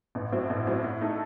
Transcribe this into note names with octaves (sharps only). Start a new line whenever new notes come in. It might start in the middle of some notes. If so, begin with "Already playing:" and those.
A1
A2 F#3 C4
A1
A2 F#3 C4
A2
A3 D#4 A4